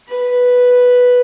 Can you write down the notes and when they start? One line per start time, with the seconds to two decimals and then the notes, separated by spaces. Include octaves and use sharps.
0.09 B4